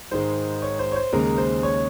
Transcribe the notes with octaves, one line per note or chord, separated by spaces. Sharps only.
G#2 D#3 G#3 C5
C#5
C5
C#5
C5
D#2 C#3 G#3 A#4
C5
C#5